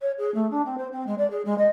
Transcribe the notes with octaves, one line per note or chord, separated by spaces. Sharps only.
C#5
G#4
A3
D4
C4
C5
C4
G#3
D5
G#4
G#3
D#5